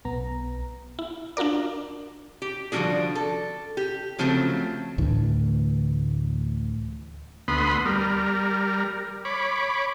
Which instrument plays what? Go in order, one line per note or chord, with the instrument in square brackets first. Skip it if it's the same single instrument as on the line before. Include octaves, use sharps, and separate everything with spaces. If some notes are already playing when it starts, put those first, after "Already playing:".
[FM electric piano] B1 B3 A#5
[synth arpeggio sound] E4
D4 F4 F#4 A#4 D5
[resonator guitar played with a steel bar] G4
D3 F3 G3 C#4 F#4 G#4
A4
G4
C#3 F3 F#3 A3 C4
[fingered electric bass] D2 A2 D3 E3
[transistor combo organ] D2 B3 B5 C6 D#6
G3 A#4
C#5 B5 D6